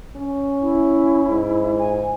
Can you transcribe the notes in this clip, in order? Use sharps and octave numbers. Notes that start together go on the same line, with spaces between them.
C#4
E4
G#2
G#5